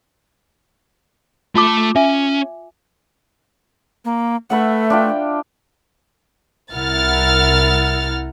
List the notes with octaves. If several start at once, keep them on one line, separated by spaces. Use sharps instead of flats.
A3 F4 A5 D6
C#4 E5 G#5
A#3
A3 B4 E5 F#5
D4 F4 G5
C2 E4 A#4 F#5 F6 A6